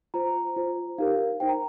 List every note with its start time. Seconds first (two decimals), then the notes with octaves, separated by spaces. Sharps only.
0.14 F4 C5 A#5
0.56 F4 C5
0.98 D#4 G4 A#4 F5
1.40 D#4 C5 G5
1.49 A#5